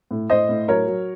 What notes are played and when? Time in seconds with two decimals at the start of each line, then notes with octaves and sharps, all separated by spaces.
0.11 A2
0.30 A2 C5 D#5
0.49 A2
0.68 F#3 A#4 C#5
0.88 F#3